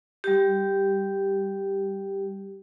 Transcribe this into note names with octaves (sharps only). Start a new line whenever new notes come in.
G3 G4